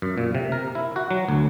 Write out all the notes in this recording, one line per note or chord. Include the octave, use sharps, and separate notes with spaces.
F#2
A#2
C3
A#4
E4
F#4
F#3
D2